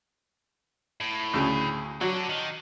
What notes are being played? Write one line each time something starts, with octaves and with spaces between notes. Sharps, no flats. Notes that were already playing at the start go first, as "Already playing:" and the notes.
A2
D2 C#3
D3 F#3 D4
D#3